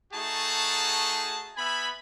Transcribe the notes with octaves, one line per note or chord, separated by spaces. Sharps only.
A3 D#4 F#4 G#4 A5
B3 E5 G#5 B5